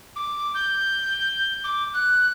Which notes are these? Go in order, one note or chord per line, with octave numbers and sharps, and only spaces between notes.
D6
G6
D6
F#6